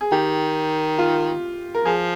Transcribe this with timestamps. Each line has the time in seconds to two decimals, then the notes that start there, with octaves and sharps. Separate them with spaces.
0.01 G#4
0.12 D#3 G4
0.98 F4
1.74 A#4
1.85 F3 G#4